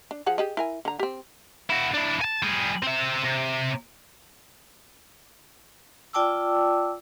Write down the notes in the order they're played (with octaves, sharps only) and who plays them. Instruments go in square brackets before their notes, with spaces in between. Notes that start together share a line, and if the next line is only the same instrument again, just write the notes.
[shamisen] D4
F3 G#4 F#5
G4 G#4 D#5
E4 A#4 G#5
D3 A#5
C4 G4
[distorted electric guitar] E4 F#4
D4 E4
G#5 A5
G3 G#4
C4 E5
C3
[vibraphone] F4 D5 G5 A5 D6 E6